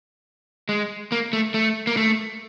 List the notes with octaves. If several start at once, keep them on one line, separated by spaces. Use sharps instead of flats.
G#3
A#3
A3
A3
A#3
A3